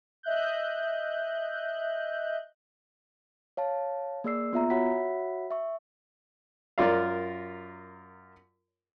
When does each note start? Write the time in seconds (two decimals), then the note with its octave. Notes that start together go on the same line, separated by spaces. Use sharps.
0.23 D#5 E5 F#6 G6
3.57 C#5 F5 A5
4.24 A#3 G#4 D5 E6 C7
4.53 B3 F4 E5 A#5
4.70 F#4 C#5 E5 F#5 B5 B6
5.51 E5 C#6
6.78 F#2 F4 A#4 D5 F5